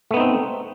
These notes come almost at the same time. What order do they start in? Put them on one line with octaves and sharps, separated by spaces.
A3 B3 D#4 C4